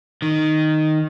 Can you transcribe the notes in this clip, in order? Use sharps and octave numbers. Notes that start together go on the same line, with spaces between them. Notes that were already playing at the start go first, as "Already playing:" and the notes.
D#3